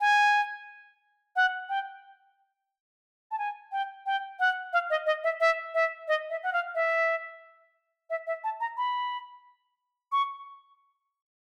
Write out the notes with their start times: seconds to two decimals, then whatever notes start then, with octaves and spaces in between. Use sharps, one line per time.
0.01 G#5
1.36 F#5
1.69 G5
3.31 A5
3.39 G#5
3.72 G5
4.06 G5
4.40 F#5
4.73 F5
4.90 D#5
5.06 D#5
5.24 E5
5.40 E5
5.74 E5
6.08 D#5
6.30 E5
6.43 F#5
6.53 F5
6.75 E5
8.10 E5
8.27 E5
8.44 A5
8.60 A#5
8.77 B5
10.12 C#6